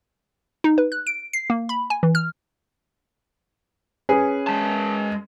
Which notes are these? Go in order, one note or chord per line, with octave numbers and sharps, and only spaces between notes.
D#4
B4
F#6
D7
C7
A#3
B5
G#5
E3
F6
C#4 G#4 B4
G#3 A5